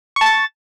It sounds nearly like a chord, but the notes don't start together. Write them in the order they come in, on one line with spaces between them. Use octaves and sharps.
C#6 A5 A6